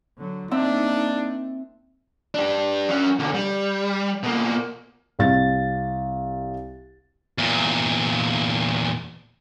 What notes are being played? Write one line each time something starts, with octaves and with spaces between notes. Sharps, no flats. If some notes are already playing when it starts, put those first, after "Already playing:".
D3 F#3
A#3 C4 D4 D#4 E5
D4 G4
F#3 C#4
B1 D3
G3
B2 A#3
C2 F5 A6
E2 A#2